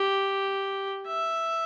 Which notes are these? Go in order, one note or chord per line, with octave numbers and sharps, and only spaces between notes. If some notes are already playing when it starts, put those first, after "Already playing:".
Already playing: G4
E5